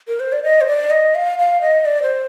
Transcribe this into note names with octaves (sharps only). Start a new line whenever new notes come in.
A#4
C5
D5
D#5
C5
D5
D#5
F5
F5
D#5
D5
C5